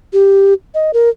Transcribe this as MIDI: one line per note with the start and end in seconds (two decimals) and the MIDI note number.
0.13 0.54 67
0.74 0.91 75
0.94 1.09 70